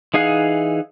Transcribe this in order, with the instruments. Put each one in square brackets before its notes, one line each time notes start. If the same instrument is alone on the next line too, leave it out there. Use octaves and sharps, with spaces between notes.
[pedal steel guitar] E3 D#4 G#4 F5 F#5